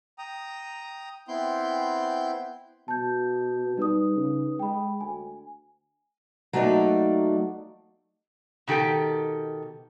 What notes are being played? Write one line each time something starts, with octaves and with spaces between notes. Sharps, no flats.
G5 A#5 D#6
B3 C4 E4 G5 C6 G6
B2 A5 G6
G3 D#4 B4 D#6
C#3
G#3 G5 B5
D2 G#5
F#3 A3 A#3 D#4 D5
B2 D#3 G4 A4 G5